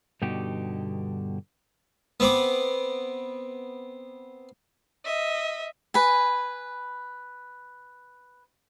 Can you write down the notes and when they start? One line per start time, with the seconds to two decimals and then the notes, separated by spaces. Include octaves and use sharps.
0.22 G2 B2 D3 D#4 F#4 G4
2.20 B3 C4 D6
5.05 D#5 E5
5.94 B4 G#5